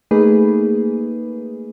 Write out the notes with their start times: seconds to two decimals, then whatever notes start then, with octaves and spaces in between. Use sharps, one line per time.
0.11 A3 A#3 D#4 G#4 B4